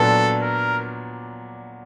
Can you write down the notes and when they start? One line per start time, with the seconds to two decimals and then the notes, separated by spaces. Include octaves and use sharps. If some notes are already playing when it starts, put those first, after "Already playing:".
Already playing: A#2 F#3 B3 D4 A4
0.42 A#4